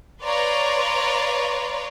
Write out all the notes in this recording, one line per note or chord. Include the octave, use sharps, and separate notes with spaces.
B4 C#5 D5 F5 A#5 C6